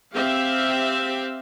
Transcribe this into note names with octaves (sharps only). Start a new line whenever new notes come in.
C4 G4 E5 F5